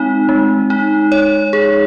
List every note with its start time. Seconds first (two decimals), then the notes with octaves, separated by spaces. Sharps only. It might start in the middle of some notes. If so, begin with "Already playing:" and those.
Already playing: G#3 C4 D#4
0.29 G#3
0.70 D#4
1.12 C#5
1.53 G#4